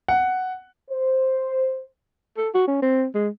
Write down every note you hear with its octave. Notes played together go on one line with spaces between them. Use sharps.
F#5
C5
A4
F#4
C#4
C4
G#3